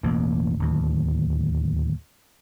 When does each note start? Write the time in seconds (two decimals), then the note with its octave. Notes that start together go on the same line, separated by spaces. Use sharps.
0.03 E1 A1 A#3
0.59 D1 D#2